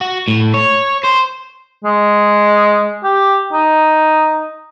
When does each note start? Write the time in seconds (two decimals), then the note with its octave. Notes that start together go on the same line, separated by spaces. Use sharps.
0.01 F#4
0.28 A2
0.54 C#5
1.04 C5
1.84 G#3
3.04 G4
3.52 D#4